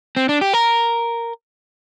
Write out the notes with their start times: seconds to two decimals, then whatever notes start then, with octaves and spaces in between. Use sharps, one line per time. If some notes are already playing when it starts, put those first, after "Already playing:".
0.17 C4
0.29 D4
0.41 G4
0.54 A#4